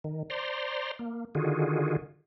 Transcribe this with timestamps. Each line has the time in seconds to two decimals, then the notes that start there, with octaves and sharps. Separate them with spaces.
0.04 D#3
0.30 C5 D5 A#5 C6
0.99 A#3
1.35 D3 D#3 F4 F#4 G#4